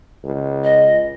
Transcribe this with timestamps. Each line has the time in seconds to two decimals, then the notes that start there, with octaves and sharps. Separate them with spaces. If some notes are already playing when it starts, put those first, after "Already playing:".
0.24 C#2
0.64 D#5